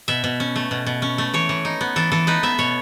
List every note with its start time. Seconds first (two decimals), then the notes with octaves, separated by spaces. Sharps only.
0.08 B2 E5
0.24 B2
0.40 C#4
0.56 A3
0.71 B2
0.86 B2
1.02 C#4
1.18 A3
1.34 E3 C#5
1.49 E3
1.65 D#4
1.81 B3
1.96 E3 A4
2.12 E3 A4
2.27 D#4 B4
2.43 B3 E5
2.59 B2 C#5